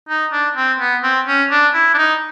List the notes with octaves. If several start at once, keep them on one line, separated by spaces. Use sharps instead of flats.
D#4
D4
C4
B3
C4
C#4
D4
E4
D4
D#4